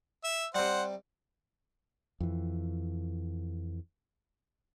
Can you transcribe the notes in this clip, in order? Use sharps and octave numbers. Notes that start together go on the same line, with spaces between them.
E5
C3 G3 C5 F#5
F2 E3